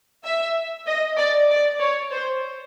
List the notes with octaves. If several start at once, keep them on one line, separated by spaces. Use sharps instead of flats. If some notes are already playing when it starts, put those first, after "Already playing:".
E5
D#5
D5
D5
C#5
C5